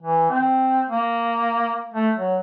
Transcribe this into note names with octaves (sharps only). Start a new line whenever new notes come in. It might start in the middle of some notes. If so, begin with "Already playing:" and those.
E3
C4
A#3
A3
F#3